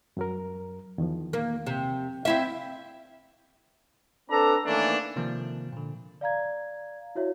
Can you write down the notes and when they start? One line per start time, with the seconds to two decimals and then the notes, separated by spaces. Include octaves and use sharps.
0.17 F#2 F#3 A#4
0.98 E2 D#3 F3
1.33 A#3
1.67 C3
2.25 C4 E4 E5 F5
4.30 C4 D4 A4 B4 A#5
4.65 D#3 E3 A3 A#3 C#4 D4
5.16 C3 D#3 F3 A#3
5.73 A#2 D3
6.21 D5 F5 A#5 G#6
7.15 E4 F#4 C#5 E5